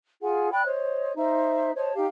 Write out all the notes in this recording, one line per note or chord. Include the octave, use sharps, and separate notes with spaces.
F4 G#4 F#5 G#5
D5 G5 B5 F#6
C5 C#5 D#5
D#4 C5 E5
C5 C#5 D#5 A5
D#4 G4 F5